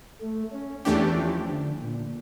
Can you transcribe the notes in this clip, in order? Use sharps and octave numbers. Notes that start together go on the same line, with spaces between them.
A3
C#4
E2 E3 A3 C#4 D4 G4
F3
D3
A#2